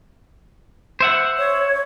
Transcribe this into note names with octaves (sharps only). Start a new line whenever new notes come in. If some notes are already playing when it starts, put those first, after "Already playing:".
C5 E5 F#5
C#5